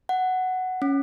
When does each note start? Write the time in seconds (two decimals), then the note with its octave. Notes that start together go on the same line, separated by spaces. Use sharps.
0.09 F#5
0.82 C#4